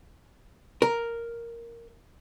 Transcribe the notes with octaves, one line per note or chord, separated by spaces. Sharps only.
A#4